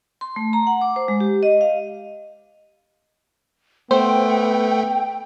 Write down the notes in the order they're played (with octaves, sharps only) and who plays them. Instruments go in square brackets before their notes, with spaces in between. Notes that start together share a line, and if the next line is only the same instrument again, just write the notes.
[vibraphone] C6
A3
A#5
F#5
D6
C5
G#3
G4
D#5
F5
[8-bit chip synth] A3 [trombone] B3 [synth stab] C5 [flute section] G5